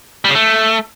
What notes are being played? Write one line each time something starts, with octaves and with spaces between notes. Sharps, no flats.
G3
C#3
A3